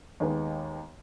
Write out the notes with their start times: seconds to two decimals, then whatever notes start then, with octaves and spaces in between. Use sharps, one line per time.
0.20 D#2 D#3 G#3 B3